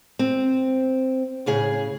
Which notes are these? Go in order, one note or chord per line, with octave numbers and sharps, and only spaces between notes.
C4
A2 C#3 G#4